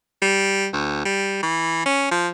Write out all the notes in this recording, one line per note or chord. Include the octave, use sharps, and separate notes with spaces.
G3
D2
G3
E3
C#4
F3